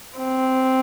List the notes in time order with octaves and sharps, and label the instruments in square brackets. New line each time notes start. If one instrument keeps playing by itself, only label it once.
[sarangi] C4